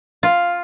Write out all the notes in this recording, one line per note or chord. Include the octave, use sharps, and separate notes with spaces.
F4